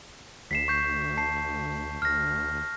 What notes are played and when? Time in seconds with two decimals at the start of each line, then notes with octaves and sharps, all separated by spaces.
0.51 D2 B6 C7 E7
0.68 C#6 G6 C7
1.17 A5 C7
2.02 D2 F6 A#6